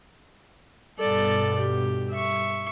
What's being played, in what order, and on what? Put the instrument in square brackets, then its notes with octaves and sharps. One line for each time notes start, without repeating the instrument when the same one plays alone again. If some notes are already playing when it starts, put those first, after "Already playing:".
[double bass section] G2 B2 G3 [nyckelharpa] A4 D5
[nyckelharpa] G4
E5 C#6